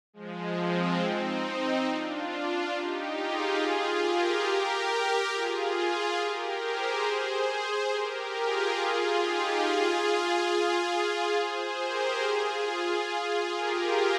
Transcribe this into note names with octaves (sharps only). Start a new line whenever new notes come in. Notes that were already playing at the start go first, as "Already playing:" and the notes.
F3 G#3
G#3 C4
C4 D#4
D4 F4
D#4 G4
F4 G#4
G4 A#4
G4 A#4
F4 G#4
G4 A#4
G#4 C5
G#4 C5
G4 A#4
F4 G#4
D#4 G4
F4 G#4
G#4 C5
G4 A#4
F4 G#4
G4 A#4